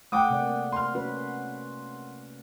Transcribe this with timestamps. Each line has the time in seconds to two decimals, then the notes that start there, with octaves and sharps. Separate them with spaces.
0.12 A3 F#5 G5 D6 D#6
0.30 C3 A#3 D5
0.72 C6 F6
0.94 C#4 F#4 B4